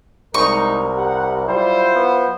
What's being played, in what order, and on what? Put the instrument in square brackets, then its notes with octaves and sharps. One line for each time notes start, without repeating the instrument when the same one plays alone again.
[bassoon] C2 [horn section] G3 G#3 D#4 [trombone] A#4 [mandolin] C#6
[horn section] G4 F#5
[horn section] F#3 F4 C5 [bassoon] G3 [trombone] E4
[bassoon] B3